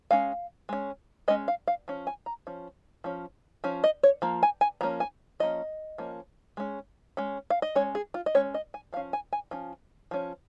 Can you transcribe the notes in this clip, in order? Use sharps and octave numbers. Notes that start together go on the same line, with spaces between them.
G#3 C#4 F5
G#3 C#4
G#3 C#4 D#5
F5
F5
F3 C#4
G#5
A#5
F3 C#4
F3 C#4
F3 C#4
D#5
C#5
F3 A#3
G#5
G#5
F3 A#3 C#4 A#5
G#5
F3 A#3 C#4 D#5
F3 A#3 C#4
G#3 C#4
G#3 C#4
F5
D#5
G#3 C#4 C#5
G#4
F4
D#5
G#3 C#4 C#5
D#5
G#5
F3 C#4 F5
G#5
G#5
F3 C#4
F3 C#4